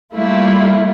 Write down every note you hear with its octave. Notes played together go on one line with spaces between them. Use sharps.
G3 A3 A#3 E4 F4